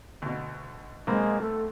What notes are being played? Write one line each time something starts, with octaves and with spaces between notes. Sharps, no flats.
D2 B2
B1 G#3 A#3 C4 B5
A3 A4